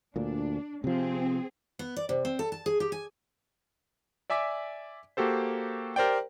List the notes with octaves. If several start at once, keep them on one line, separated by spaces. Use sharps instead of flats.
D2 A#2 D4
C3 F3 C4 G#4
B3
D5
C3
C4
A4
A5
G#4
G4
G#5
D5 E5 G#5 D6 B6
A#3 F#4 G4 A4 C5
G4 A#4 C5 D5 G5